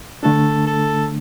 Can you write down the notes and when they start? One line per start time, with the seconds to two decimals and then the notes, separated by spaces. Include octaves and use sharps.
0.23 D3 A3 D4 A4
0.67 A4